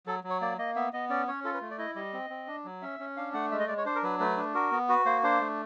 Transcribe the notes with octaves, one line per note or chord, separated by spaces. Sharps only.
F#3 A4
F#3
C#5
A#3 D5
A#3 D#5
B3 E5
B3 D#5
C#4 D5
C#4 C#5
F4 A4
B4
A3
D5
E4 D#5
G3 D#5
C4
C4
D4
F#3
C#4 E5
C#4
D4 F5
A3 F#5
G#3 E5
D#5
G#3 D5
C#5
D4 C5
A#4
F#3 B4
A3 B4
D4
F#4 A#4
B3
F#4 B4
A#3 C5
D4 C5
A3